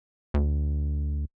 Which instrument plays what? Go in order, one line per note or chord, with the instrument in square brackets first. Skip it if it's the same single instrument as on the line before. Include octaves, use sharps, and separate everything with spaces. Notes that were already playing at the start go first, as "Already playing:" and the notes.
[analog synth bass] D2